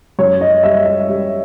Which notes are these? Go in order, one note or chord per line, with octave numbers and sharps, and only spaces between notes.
F#2 C#5
D#5
G3 E5
E5
G3